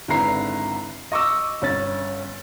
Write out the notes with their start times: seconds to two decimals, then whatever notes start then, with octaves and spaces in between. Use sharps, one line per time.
0.08 G#1 D3 E4 B4 A#5 C7
1.12 D#5 C#6 D6 E6
1.62 G1 C#4 A6